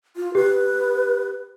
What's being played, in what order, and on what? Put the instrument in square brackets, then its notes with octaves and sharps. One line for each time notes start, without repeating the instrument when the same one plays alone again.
[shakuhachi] F4
[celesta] G4 [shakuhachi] B4